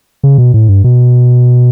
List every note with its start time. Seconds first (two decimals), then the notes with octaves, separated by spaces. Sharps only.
0.24 C#3
0.38 B2
0.54 A2
0.68 G2
0.84 B2